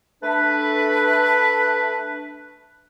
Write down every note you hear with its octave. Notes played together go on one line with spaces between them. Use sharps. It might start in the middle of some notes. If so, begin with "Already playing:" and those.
A3 D4 B4